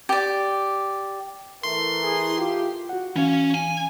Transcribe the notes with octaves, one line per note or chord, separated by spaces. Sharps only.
G4 D5
E3 A3 A#4 C6
E4 G#4
F4 G4
F#4 F#5
E3 C#4 F5
G#5